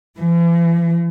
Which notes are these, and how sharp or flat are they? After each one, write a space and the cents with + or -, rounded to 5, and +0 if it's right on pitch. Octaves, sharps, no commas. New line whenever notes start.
E3 +45